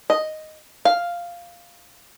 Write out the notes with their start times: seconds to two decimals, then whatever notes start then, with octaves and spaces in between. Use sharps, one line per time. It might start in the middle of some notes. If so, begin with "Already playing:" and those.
0.10 D#5
0.85 F5